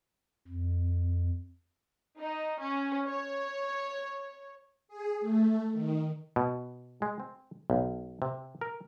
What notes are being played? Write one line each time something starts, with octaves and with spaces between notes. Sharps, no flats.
F2
D#4
C#4
C#5
G#4
A3
D#3
B2
G#3
C4
B1
C3
A#4